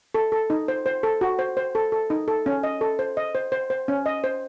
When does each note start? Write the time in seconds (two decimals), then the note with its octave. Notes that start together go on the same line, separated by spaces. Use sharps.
0.15 A4
0.32 A4
0.50 D#4
0.68 C5
0.86 C5
1.03 A4
1.21 F#4
1.39 C5
1.57 C5
1.75 A4
1.92 A4
2.10 D#4
2.28 A4
2.46 C#4
2.63 D#5
2.81 A4
2.99 C5
3.17 D#5
3.35 C5
3.52 C5
3.70 C5
3.88 C#4
4.06 D#5
4.24 C5